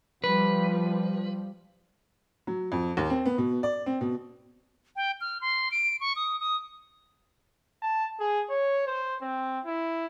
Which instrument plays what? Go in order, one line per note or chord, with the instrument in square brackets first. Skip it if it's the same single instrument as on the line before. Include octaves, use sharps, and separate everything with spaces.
[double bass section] F3 G3 [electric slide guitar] B4
[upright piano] F#3
F2
D#2
C4
B3
B2
D5
C4
B2
[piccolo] G5
F6
C6
D7
C#6
D#6
D#6
[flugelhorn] A5
G#4
C#5
C5
C4
E4